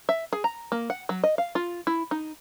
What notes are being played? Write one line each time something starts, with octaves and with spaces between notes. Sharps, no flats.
E5
G#4
A#5
A#3
F#5
F#3
D#5
F5
F4
E4
D#4